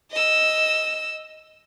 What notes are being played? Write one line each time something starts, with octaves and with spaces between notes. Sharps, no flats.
D#5 E6